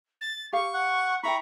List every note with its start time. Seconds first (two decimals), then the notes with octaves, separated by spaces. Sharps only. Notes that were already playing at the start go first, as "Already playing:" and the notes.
0.21 A6
0.53 G4 F5 C#6
0.74 F#5
1.23 E4 E5 G5 A#5 B5 C#6